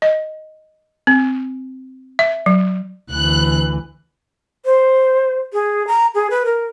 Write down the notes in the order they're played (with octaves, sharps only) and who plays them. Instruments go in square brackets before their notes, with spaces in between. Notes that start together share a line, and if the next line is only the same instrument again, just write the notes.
[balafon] D#5
C4
E5
F#3
[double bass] D2 E3 [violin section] F#6
[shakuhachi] C5
G#4
A#5
G#4
B4
A#4